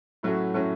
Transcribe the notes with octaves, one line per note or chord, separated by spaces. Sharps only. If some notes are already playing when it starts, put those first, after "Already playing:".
A2 F#3 A3 C#4 F#4
A2 F#3 A3 C#4 F#4